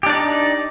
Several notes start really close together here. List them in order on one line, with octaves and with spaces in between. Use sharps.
G4 D4 D5 D#4